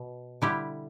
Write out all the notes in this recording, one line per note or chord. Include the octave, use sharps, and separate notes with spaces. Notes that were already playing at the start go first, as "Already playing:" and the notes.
Already playing: B2
D3 G3 E4 G4